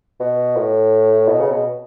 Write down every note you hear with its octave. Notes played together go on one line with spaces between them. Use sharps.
B2
A2
B2
C#3
B2